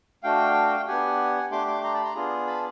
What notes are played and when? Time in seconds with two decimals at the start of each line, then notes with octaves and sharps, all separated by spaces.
0.23 A3 D4 F#4 F5 G5
0.87 B3 D4 G4 F#5 G#5
1.51 A3 D4 G4 C6 D6
1.67 C6 D6
1.84 A#5 C6
1.94 A5 B5
2.04 A#5 C6
2.15 B3 D4 F4 G#4
2.47 A5 B5